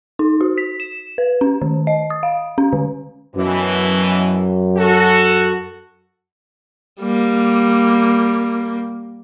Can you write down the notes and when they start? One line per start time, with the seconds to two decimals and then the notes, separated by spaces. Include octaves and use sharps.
0.19 D#4
0.41 F#4
0.58 B6
0.80 E7
1.18 B4
1.41 C#4
1.62 D#3
1.87 D#5
2.10 D#6
2.23 F5
2.58 C#4
2.73 D3
3.35 F#2 B2 E3
4.77 F#4 A4
7.02 G3 A#3